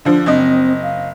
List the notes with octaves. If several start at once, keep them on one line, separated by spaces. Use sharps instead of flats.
D3 F3 D4
F#1 C4 D#5
F5